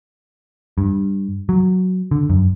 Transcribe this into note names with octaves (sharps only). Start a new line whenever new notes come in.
G2
F#3
D3
F#2